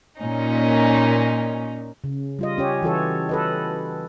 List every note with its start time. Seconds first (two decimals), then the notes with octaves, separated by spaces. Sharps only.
0.19 A#2 C#4 D#4
2.04 C#3
2.39 G3 F4 D#5
2.58 C#4 G4 C#5
2.82 E3 F#4 A4 C#5
3.29 A4 B4 D#5